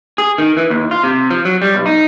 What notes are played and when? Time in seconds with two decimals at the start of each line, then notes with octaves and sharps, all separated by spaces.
0.18 G#4
0.38 D#3
0.57 E3
0.70 D#2
0.91 F4
1.04 C3
1.30 F3
1.45 F#3
1.62 G3
1.75 B1
1.86 D#4